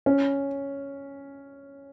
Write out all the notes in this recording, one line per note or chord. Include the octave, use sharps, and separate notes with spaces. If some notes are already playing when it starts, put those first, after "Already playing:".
C#4